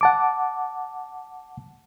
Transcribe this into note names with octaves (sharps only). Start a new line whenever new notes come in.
F#5 A5 D6